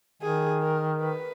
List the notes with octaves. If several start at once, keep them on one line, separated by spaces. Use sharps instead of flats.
D#3 G#4
A#4
B4